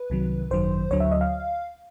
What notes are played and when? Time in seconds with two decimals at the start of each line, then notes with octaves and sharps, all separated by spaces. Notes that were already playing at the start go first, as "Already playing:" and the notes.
Already playing: B4
0.10 C2 C3 D#3 F#3
0.51 G#1 F#2 D#3 F#3 C5
0.91 D2 D3 F#3 C#5
1.00 E5
1.11 D#5
1.21 F5